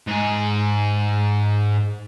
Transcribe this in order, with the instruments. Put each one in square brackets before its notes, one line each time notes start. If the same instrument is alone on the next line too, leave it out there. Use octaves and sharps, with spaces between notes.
[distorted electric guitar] G#2 G#4